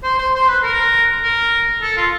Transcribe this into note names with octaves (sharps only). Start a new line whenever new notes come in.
C5
C5
C5
B4
A#4
A#4
A4
F4